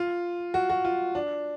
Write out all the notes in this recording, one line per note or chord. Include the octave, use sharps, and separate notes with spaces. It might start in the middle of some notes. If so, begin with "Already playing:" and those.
Already playing: F4
F#4
F#4
F4
D4